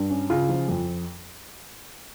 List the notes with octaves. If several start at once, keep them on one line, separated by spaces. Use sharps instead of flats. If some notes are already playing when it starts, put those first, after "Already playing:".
Already playing: G2
C#4
C#3 F4
F3
F2